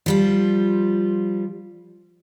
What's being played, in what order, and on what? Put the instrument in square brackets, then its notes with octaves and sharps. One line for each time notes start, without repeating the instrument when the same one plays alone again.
[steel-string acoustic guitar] F3 G3 F4